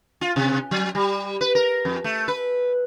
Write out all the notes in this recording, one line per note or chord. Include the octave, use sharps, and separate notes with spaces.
F4
C3
F#3
G3
B4
A#4
F2
A3
B4